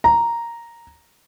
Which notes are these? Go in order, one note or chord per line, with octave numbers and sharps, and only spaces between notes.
A#5